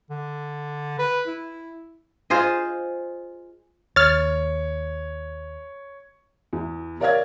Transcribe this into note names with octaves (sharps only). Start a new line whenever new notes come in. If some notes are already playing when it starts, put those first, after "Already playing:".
D3
B4
E4
F4 G#4 C5 D#5
D#2 C#5 F6 A6
E2
A#4 C#5 D5 F5 F6 G#6